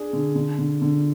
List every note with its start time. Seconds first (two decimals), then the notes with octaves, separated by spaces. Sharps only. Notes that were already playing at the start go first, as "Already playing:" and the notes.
Already playing: D4 G#4
0.13 D3
0.35 D3
0.58 D3
0.82 D3